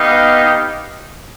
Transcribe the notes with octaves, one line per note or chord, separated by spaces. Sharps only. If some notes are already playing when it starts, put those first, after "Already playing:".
Already playing: B3 D#4 G4 F5